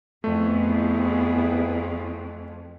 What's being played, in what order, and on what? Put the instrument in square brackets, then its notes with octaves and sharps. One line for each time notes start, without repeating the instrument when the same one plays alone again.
[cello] F2 [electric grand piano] A3 [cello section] B3 E4 G#4